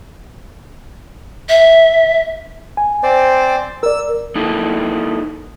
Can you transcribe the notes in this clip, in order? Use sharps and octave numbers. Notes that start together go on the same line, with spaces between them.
E5
G#5
C4 C5 D5
A#4 D5 E6
A#3 D#4 E4 A4